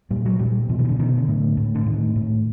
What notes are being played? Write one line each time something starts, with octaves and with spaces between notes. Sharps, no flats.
A#2 G3
F#3
A#2 G3
B2 F3
E3
D#3
D3
B2 D#3
D3
A2
A2
D3
A2 D#3
A2